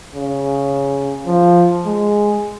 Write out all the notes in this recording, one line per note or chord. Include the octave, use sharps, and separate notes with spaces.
C#3
F3
G#3